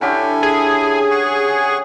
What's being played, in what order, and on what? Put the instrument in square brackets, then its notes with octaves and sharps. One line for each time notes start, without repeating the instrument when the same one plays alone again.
[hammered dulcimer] D3 C#4 G4 [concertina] E4 A4 G#5
[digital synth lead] G#4
[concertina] F#5 C#6